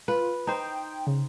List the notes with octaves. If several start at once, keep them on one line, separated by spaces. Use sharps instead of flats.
F4 B4
D#4 C5 G5
C#3